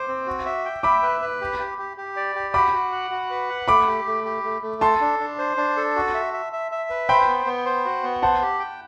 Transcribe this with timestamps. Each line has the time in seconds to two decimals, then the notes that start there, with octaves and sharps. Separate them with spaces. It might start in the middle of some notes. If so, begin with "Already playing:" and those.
Already playing: C5 D6
0.08 C4
0.27 F#4
0.46 E5
0.65 G5
0.83 E5 B5 D6
1.03 B4
1.21 B4
1.41 G4
1.59 G4
1.78 G4
1.97 G4
2.16 D5
2.36 G4
2.54 F#4 B5 D6
2.73 F#4
2.92 F#5
3.11 F#4
3.30 B4
3.49 F#5
3.68 A3 B5 D6
3.87 G4
4.06 A3
4.25 G4
4.44 A3
4.62 A3
4.81 A4 A5 C6
5.01 D4
5.19 D4
5.39 C5
5.57 D4
5.77 A4
5.96 F#4
6.15 E5
6.34 E5
6.53 E5
6.72 E5
6.90 B4
7.09 C5 G5 B5
7.27 B3
7.46 B3
7.65 C5
7.85 F#4
8.03 B3
8.22 C5 F#5 A5
8.42 G4
8.60 G5